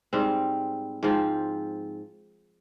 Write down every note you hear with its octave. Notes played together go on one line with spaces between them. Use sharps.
G#2 G3 C4
G#2 F3 C4